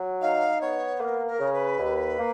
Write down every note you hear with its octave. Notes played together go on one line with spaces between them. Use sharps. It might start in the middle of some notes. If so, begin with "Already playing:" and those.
Already playing: F#3
D#4 F5
B3 C#5
A#3 A#4 B4
A#4
C#3
B4
D#2
A#3